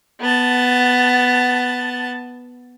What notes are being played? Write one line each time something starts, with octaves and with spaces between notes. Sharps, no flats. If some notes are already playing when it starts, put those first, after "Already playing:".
B3 A5